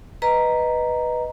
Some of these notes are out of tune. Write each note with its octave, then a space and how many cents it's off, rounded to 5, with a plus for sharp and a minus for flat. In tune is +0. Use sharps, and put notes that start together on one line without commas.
B4 +0 D#5 +0 A#5 +0